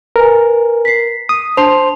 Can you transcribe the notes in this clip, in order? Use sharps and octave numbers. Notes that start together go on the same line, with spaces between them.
A#4 B4 G#5
B6 C7
D#6
D4 C5 A5 C6 F7